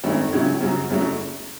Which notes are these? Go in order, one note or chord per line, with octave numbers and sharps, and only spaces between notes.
G#1 F#2 D#3 A3
C#2 C#3 F#3 C#4 E4
F#2 C#3 F#3
F#1 F#2 C#3 F#3 A3